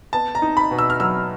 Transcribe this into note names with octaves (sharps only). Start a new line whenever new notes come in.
B3 A5
A#5
D#4
B5
B2
E6
F6
F#3 E6